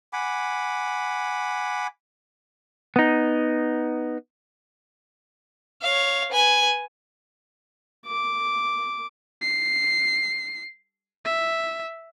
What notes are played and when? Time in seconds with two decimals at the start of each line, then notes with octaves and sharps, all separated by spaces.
0.13 F#5 G#5 B5 D6
2.96 B3 D#4
5.82 C#5 F5
6.32 B4 G#5
8.06 D6
9.42 C7
11.25 E5